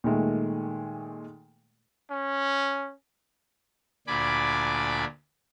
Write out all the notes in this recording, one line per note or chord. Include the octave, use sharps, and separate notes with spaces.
A#2 D#3 G#3 A3
C#4
D2 A#2 D4 G#5 B5 D6